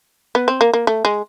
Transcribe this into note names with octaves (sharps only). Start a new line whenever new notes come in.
B3
C4
A#3
A#3
A3
G#3